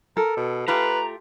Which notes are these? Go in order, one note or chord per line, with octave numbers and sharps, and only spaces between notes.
A4 A#4
B2
A3 F4 G4 B4 A#5